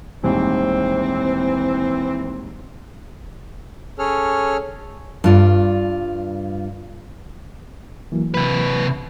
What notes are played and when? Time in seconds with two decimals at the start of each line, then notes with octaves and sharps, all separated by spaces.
0.24 D#1 G#2 E3 C4
3.99 C#4 G#4 A4 C#5 F6
5.24 G2 F4 D5
8.12 E3 F#3 A#3
8.34 C3 B4